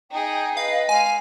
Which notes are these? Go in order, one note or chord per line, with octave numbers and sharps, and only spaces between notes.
D#4 G#4 G5
B4 D#5 F5
G#3 F5 G#5